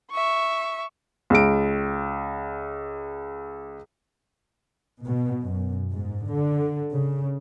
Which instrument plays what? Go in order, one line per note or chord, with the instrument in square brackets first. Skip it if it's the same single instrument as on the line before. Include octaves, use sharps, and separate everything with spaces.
[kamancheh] E5 C#6
[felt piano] C#2 D7
[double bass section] B2
F#2
G#2
D3
C#3